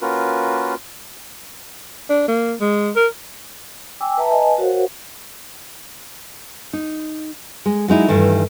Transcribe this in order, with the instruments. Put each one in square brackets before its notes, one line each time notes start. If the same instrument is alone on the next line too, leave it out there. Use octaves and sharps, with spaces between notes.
[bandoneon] A#3 C#4 F4 F#4 A#4 B4
[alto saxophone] D4
A#3
G#3
A#4
[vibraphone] G5 G#5 D6 E6
B4 E5 A5 A#5
B4 D#5 F5 G#5 A5
F#4 A#4 C5 C#5 F5 F#5
[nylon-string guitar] D#4
G#3
F#3 G#3 D#4 E4
G2 D#3 E3 A3